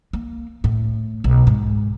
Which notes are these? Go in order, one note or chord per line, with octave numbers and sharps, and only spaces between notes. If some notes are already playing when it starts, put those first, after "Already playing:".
A#3
A2
B1
G#2